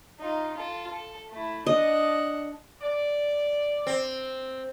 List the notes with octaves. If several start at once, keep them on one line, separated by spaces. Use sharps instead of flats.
D#4 F4
F4 A4
A4
A3 E4
D4 D#5 F#5
D5
C4